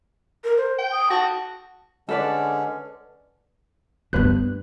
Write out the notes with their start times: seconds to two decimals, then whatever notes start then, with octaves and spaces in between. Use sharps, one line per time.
0.44 A#4
0.57 C5
0.78 G5
0.91 D#6
1.10 F#4 A5
2.09 D3 G#3 C#4 A4 B4 D5
4.13 G2 B3 D4 B4 F#6